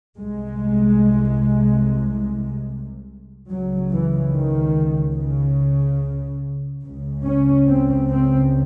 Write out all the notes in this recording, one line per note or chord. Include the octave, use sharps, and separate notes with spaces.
C2 C3 G#3
C#2 C#3 F#3
E3
D#3
C#3
C#2 C#3
C#4
C4
C4